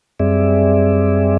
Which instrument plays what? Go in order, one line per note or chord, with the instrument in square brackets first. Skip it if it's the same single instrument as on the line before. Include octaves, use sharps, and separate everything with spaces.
[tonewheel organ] F#2 G3 C4 G#4 D5 E5